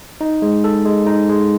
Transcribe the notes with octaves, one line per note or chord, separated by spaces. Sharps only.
D#4
G#3
A4
G#3
D#4
G#3